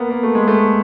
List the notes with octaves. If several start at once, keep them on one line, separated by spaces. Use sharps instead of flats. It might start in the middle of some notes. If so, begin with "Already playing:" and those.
Already playing: A#3 B3
A#3
A3
G#3
A3